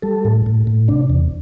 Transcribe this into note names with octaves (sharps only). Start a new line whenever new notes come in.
G3 A4
A2
A2
A2
C3 D4
E2